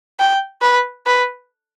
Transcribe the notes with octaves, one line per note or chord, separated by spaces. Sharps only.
G5
B4
B4